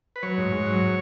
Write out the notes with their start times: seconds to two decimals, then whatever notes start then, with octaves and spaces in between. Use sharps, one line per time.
0.16 B4
0.23 F#3 C#5
0.38 G#2
0.52 G#2
0.66 F#3